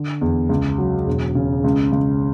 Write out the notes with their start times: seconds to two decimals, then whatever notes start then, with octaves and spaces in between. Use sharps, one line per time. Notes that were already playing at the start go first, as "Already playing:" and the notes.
Already playing: D3
0.21 E2
0.49 C#2
0.78 F#3
1.07 E1
1.35 C#3
1.64 C#2
1.92 C#2